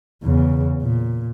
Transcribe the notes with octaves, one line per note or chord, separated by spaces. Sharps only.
E2 C#3
A#2